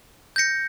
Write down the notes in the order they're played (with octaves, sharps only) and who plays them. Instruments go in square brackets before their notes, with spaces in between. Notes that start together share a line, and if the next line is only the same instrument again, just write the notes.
[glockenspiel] G6 A#6 C#7